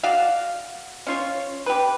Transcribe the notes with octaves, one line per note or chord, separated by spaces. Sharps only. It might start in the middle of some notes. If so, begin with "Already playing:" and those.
F#4 D5 F5
C#4 F4 C#5
G4 B4